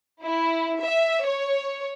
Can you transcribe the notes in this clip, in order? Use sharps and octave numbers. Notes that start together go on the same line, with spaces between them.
E4
E5
C#5